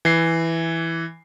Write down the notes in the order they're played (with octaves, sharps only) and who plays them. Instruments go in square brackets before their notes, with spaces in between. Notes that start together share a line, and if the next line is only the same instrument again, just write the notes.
[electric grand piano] E3 C7